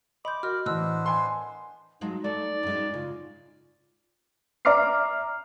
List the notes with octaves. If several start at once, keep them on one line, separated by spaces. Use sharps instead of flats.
D#5 B5 C6 D6 G6
F#4 A#4 D#5 F6
A2 E3 B3 D4 C5 D#5 E6 F#6
G#5 C6
F3 F#3 G#3 D#4
A3 D5
F#2 G#3
C#3 F4
D5 E5 A#5 D6 F6 C7